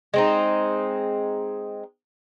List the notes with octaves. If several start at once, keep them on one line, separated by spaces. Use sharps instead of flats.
G#3 C4 D#4